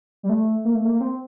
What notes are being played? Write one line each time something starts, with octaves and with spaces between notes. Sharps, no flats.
G3
A3
A#3
A3
A#3
C4